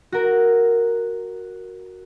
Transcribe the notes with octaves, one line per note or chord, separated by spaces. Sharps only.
F#4 A#4